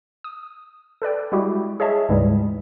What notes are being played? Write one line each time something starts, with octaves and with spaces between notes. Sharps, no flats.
D#6
A4 B4 D5 G5
G3 G#3 E4 F#4 G4
G#4 C#5 D#5 E5 A5
D2 G#2 C#3 E3 G3 G#3